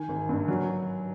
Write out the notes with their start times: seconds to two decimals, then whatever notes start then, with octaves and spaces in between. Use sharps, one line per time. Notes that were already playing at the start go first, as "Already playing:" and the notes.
Already playing: D#3 G#5
0.09 G#1
0.29 G2
0.48 F#3